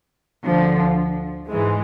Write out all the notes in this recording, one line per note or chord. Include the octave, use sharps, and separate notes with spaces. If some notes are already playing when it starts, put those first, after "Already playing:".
D2 D3 F3
G#2 E3 G#3